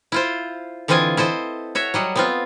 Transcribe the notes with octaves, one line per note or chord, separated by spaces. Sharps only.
E4 F4 C5
D3 E3 C4 F4 D#5 G#5
E4 A4 C5 D#5
F#4 C#5 E5
F#3 G3 D#5
B3 C4 F4